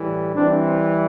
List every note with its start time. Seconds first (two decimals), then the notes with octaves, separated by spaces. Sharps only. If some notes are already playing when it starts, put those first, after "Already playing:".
Already playing: A2 E3 G3
0.35 E3 G3 C4 D4